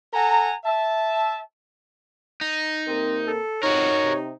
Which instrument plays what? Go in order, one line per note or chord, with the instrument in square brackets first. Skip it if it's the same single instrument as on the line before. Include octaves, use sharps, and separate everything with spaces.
[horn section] A4 F#5 G#5 A#5
E5 A5
[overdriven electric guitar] D#4
[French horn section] C3 A#3 A#4 [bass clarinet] C4
[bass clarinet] A4
[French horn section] F2 C3 [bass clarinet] D#4 [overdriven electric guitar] F#4 A#4 [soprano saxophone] C#5
[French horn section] C3